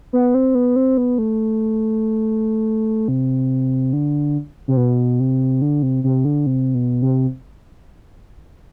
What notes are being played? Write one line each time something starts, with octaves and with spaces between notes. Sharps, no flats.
B3
C4
B3
C4
B3
A3
C3
D3
C3
B2
C3
D3
C3
C3
D3
C3
B2
C3